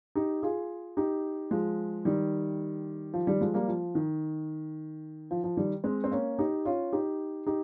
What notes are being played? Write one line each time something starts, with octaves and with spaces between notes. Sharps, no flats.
D#4 G4
F4 G#4
D#4 G4
F3 G#3
D#3 G3
F3
D#3 G3
F3 G#3
G3 A#3
F3
D#3
F3
F3
D#3 G3
G#3 C4
C4
A#3 C#4
D#4 G4
C#4 F4
D#4 G4
D#4 G4